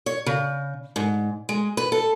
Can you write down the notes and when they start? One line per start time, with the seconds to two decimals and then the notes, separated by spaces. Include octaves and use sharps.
0.06 C#5
0.26 C#3
0.96 G#2
1.49 G#3
1.77 B4
1.92 A4